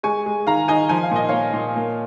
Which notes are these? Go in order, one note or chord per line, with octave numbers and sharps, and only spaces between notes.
G#3 G#5 C#6
G#3
D#3 F5 A#5
D#3 D#5 G#5
F3 G#5
F5
A#2 D#5
A#3 C#5 F5
A#2
A#3